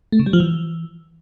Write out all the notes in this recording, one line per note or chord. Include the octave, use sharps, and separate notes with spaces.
A3
C#3
G3
F3
E3